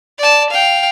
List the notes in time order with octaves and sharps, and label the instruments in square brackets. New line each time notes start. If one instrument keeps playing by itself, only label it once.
[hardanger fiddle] D5 A5
F5 G5